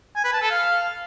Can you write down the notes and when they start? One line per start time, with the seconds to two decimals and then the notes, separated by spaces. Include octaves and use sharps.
0.16 G#5
0.24 B4
0.33 A5
0.42 A4
0.50 F5